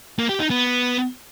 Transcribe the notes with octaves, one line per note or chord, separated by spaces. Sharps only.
A#3
G4
D#4
B3